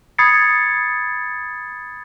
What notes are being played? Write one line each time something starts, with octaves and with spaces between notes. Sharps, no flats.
B5 D#6 G#6 A6 C7 C#7